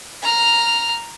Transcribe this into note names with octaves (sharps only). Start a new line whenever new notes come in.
A#5 F6